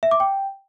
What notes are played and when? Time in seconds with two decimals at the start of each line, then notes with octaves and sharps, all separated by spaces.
0.03 E5
0.11 D6
0.20 G5